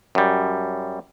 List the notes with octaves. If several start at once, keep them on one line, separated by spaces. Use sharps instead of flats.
F#2 G3